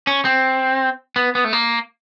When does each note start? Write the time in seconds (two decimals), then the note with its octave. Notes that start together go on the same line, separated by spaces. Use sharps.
0.07 C#4
0.25 C4
1.16 B3
1.35 B3
1.45 A3
1.53 A#3